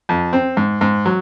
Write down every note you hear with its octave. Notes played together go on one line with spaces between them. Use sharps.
F2
C4
G#2
G#2
F#3